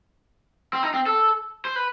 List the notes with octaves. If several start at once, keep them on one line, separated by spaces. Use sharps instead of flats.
C4
D#4
C4
A4
C5
B4